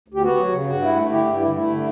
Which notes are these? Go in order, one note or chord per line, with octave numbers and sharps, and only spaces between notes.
D2
G4
B3 F#4
F#3
C#3
G2 F#4
E4
A3
D3 E4 G4
G2
E4
A3 E4
D3